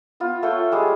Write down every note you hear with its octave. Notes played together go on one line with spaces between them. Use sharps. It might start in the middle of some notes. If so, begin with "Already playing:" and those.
B3 F4
A3 F4 C#5 G5
G3 G#3 G#4